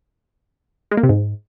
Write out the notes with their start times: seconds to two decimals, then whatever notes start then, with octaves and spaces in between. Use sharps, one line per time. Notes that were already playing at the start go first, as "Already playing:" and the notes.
0.91 G#3
0.97 A#3
1.03 C3
1.09 G#2